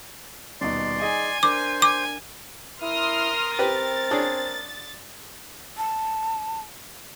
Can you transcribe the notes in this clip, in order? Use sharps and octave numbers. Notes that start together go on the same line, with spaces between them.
D#1 B2 D#4 D5 C6
D#4 G#4 D#5 G#5
D4 A#4 C5 D6
G#5 D6
E4 A#4 C6 D#6 F6
C4 G4 B4 A6
D4 G#4 C#5
A5